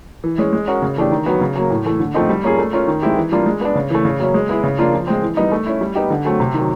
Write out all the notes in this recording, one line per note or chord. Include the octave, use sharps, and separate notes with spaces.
E3
G#3 C#4
G#3
C#4 F#4 A#4
C#3
E3 A3 D4 G4
D#3
F#3 B3
C#3
F#3 A#3
A2
E3 A3
D3
F3 A3 C4 D#4
G3
A#3 C#4 F4 G#4
A3
C#4 F4 A#4
D#3
G#3 C4 E4 G4
E3
G3 A#3 D4 F4
G#3
B3 D4
C#3
E3 A3
C#3
F#3 A#3 C#4
G#3
B3 E4 G#4
C#3
F3 A#3 D4 F4
F3
G#3 C4
E3
G3 B3 D#4
A3
C#4 E4
G3
B3 D#4 G4
D3
F#3 A3 C4
C3
D#3 F#3